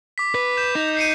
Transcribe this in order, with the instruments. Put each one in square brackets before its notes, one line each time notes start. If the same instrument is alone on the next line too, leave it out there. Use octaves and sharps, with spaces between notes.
[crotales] D6 B6
[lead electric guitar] B4
[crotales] G6 E7
[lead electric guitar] D#4
[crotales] C7 C#7 D#7